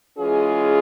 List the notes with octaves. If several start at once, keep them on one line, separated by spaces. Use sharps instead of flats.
E3 G#3 C#4 F4 G#4